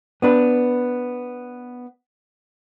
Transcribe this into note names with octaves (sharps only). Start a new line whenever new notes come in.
B3 D4 B4